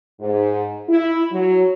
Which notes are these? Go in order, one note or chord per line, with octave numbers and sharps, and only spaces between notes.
G#2
E4
F#3